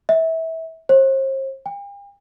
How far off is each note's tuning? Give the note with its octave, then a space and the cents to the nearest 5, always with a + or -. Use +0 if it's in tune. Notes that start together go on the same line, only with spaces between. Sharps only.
E5 -25
C5 +40
G5 +45